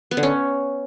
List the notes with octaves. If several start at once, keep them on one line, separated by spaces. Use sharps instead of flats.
B3
D3
C#4